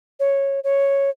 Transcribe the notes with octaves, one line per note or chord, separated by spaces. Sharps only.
C#5
C#5